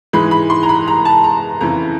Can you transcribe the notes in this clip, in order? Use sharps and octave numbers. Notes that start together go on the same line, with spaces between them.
G#2 E3 G#3 B5
B5
C6
A#5
B5
A#5
A5
A#5
F2 C#3 E3 A#5